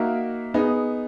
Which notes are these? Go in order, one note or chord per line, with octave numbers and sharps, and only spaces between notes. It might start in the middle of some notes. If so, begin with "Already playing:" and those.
Already playing: A#3 D#4 F#4 A#4 E5
B3 D#4 G#4